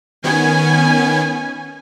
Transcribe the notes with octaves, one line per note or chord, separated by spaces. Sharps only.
D#3 B3 C#4 G#5